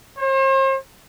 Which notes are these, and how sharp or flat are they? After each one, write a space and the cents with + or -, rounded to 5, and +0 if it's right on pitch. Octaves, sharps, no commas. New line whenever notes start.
C5 +40